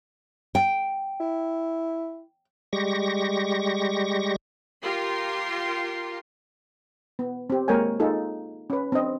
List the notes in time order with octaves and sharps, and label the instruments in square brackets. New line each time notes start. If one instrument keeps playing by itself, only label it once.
[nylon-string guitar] G5
[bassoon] E4
[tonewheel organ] G3 G#3 G4 C#6 A#6
[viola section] F4 G4 A#4 C6
[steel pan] B3
C4 G4
G#3 A#3 A#4 C#5 G5 G#5
D#4 F4 G#4 A4
C#4 B4
C4 D4 D#5